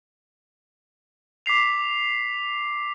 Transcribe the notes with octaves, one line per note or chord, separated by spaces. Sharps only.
D6 B6 C7 F7